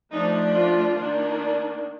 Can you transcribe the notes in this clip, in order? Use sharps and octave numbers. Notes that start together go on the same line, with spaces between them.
F3 A3 D4 D#4
F4
D#3 A#3 D4